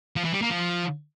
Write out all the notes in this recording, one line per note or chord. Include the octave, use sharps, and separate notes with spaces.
F3
E3
G3
A#3
F3